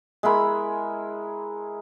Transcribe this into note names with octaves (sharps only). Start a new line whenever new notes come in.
G#3 E4 A#4 B5